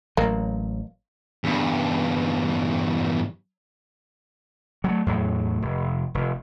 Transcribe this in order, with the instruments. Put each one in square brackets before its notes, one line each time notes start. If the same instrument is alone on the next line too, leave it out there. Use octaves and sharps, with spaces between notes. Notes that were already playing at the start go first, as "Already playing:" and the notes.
[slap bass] A1 F#3 [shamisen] A#3
[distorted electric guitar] E2 G2
[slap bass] F#3 G#3 A3
E2 A2 F#3
F1
F1